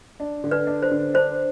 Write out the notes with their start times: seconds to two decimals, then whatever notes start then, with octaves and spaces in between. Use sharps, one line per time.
0.20 D4
0.44 D3
0.51 B4 D5
0.67 D4
0.82 C5
0.91 D3
1.14 D4 C5